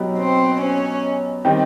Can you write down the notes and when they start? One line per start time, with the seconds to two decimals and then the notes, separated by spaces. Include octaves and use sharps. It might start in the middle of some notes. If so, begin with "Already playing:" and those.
Already playing: B2 F#3 B3 D#4 G4
0.18 C4
0.61 C#4
1.45 D#3 G3 C4 D#4 G4